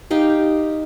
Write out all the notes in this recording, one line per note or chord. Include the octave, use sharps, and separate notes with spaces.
D#4 G4 F5